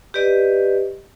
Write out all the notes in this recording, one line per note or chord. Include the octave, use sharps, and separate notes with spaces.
G4 B4 D5 D#5